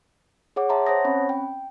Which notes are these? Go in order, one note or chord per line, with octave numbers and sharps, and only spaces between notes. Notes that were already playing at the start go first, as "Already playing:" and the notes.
G#4 C#5 F#5 D6
C#5 E5 A5 A#5 C6
C5 C#5 F#5 A5 D#6 A#6
C4 C#4 B5
G5